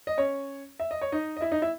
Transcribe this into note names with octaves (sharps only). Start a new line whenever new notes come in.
D#5
C#4 C#5
E5
D#5
C#5
D#4 D#5
D#5
E4 E5
D#4 D#5
E4 E5